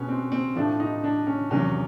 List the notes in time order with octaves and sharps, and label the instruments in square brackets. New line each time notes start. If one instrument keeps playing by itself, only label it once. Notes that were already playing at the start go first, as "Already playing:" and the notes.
Already playing: [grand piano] B2 G#3 B3 C#4
C4
C4
A2 F3 A3 D4
D#4
D4
C#4
E2 C3 D#3 F#3 C#4